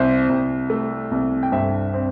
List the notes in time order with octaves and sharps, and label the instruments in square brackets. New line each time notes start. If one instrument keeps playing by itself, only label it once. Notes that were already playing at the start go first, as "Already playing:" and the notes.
Already playing: [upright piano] C2 C5 E5
C2
A3
C2
G5
G2 C5 E5
C4